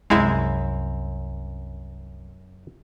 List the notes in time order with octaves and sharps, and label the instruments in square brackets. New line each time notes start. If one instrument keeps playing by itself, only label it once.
[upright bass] C2 [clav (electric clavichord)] F#2 C4 F5 [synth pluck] G#3 E4